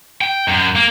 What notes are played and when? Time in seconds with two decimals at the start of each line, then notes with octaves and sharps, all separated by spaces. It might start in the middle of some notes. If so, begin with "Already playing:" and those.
0.21 G5
0.48 F#2
0.76 A#3